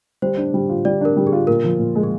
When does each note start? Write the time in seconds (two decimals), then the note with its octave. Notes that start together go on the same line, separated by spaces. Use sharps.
0.22 G3 C5
0.37 D4
0.54 G3
0.69 F4
0.85 G3 D5
1.01 D4 A#4
1.17 G3
1.27 G#4
1.32 F4
1.47 A#2 A#4
1.64 F3
1.79 A#2
1.95 G#3
2.03 G#4